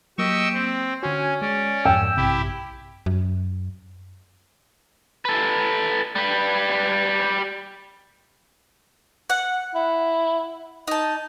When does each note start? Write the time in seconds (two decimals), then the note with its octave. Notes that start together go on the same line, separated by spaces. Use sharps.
0.18 F#3 A#3 G4 D#5 C#6 E6
0.54 C4
1.03 D3 C#4 F#4 G#5
1.42 G#3 C#4 D5
1.85 F2 G#2 G5 E6
2.17 A#1 G2 C3 E4 G4
3.06 F#2
5.25 A4 B4
6.16 G3 B4
9.30 F#5
9.75 E4
10.88 D#4 D#5 A5